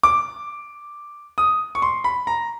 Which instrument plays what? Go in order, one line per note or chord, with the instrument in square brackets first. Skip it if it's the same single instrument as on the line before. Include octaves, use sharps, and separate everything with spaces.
[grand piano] D6
D#6
C#6
C6
B5
A#5